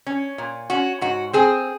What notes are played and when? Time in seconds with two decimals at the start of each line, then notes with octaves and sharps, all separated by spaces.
0.07 C#4
0.38 A#2
0.70 C#4 F#4
1.01 G#2 F#4
1.33 C4 G#4